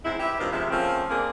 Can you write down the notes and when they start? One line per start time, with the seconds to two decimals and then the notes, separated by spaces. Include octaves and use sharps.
0.05 E2 G#2 C4 E4
0.19 E4 G4 B4 E5
0.39 G2 D#3 C4 D4 F4 C5
0.52 E2 C3 F3 G#3 E5
0.70 C#3 F3 A3 A#3 C4 C#4
1.10 A#3 C4 D4 F4 G#4 A#4